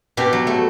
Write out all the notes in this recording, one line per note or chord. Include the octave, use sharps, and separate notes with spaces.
B2 G4
F#3
A3